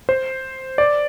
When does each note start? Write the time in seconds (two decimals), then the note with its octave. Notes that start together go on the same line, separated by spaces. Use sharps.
0.09 C5
0.78 D5